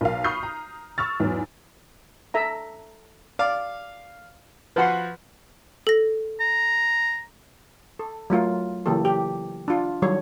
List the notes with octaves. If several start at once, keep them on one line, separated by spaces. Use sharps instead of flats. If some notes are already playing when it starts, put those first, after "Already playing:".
B1 A#4 F5
B5 C#6 D#6 F6 G6 C7
A#5
C#6 E6 F6 A6
E2 G#2 F#3
A4 E5 A#5
D5 F5
F3 F#4 B4 F#5 C6
A4 A#6
A#5
A4
F#3 A3 F4 A#4
C#3 E3 F#3 A#3 G4 A4
G4
D4 F4
D#3 F#3 G3 A4 C#5